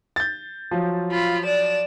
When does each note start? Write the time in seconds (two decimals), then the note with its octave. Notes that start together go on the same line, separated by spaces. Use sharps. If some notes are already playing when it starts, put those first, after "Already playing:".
0.16 G6 A6
0.71 F3 F#3
1.11 F4 B5
1.45 D5 E7